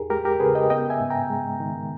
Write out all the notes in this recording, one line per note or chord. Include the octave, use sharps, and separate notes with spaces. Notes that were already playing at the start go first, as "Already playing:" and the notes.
Already playing: E2 D#4 G4 G#4 A#4
G#3 G4 A#4
G4 A#4
C#3 G#4 B4
D#5 G5
B3 D#5 G5
E5 G#5
G#2
G5 A#5
G#3
D#3